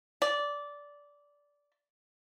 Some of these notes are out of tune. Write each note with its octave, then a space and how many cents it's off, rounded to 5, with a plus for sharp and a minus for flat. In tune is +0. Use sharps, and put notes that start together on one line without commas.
D5 -15